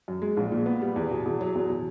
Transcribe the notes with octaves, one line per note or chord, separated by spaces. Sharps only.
F#2
G#3
A#1
A#2
B3
G3
E2
B2
E2
F#3
E2
B2